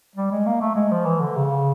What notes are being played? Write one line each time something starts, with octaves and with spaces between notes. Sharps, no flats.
G3
G#3
A#3
A3
G#3
F3
E3
D3
C#3